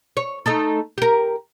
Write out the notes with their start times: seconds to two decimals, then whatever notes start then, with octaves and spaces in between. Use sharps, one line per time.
0.17 C#5
0.46 A3 D#4 A4
0.98 G4 A#4